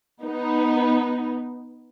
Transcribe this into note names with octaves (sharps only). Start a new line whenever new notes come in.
B3 D#4